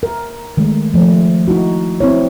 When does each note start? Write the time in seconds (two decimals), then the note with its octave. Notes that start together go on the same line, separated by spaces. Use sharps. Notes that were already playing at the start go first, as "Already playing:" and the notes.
0.03 A#4
0.57 D#3 G#3 A3
0.94 F3 A3
1.48 D#4 E4 F#4
2.00 C4 E4 C#5